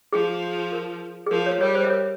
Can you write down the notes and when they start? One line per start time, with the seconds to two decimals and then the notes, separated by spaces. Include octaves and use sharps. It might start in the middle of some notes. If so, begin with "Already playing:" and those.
0.12 F3 G#4
0.72 A#4
1.26 G#4
1.31 F3 A#4
1.46 A#4 C#5
1.61 G3 A#4 C#5
1.75 C5
1.85 E5
1.90 A#4 C#5